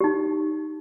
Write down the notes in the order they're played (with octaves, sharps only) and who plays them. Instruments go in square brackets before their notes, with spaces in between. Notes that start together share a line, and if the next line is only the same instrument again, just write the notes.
[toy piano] D#4 G4